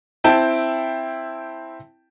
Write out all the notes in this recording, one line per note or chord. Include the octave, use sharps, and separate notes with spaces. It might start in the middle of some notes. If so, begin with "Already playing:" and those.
C4 E4 G5 A5